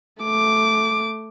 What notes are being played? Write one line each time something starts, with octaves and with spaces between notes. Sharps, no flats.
A3 D6